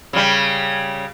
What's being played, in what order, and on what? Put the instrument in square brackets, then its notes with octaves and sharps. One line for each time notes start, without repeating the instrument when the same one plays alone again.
[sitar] C#3 G3